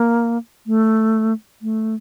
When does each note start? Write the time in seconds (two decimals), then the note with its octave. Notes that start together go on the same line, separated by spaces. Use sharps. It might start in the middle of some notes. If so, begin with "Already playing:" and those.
Already playing: A#3
0.66 A3
1.62 A3